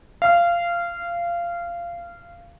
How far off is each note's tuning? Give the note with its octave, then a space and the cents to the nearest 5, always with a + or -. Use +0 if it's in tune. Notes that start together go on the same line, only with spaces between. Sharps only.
F5 -20